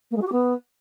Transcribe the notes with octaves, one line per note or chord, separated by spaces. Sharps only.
A#3
G#3
F#4
G4
B3